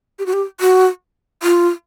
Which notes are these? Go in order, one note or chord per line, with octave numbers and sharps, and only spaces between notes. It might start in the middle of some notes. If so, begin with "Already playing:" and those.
G4
F#4
G4
F#4
F4